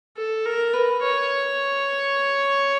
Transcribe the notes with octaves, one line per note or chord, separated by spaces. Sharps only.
A4
A#4
B4
C#5